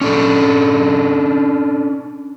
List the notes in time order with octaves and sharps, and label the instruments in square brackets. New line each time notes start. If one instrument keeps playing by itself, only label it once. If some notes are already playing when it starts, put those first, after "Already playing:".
[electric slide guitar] C#4 D4 A4